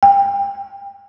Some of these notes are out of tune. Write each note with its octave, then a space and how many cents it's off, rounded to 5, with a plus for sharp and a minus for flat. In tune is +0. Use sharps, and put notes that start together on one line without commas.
G5 +30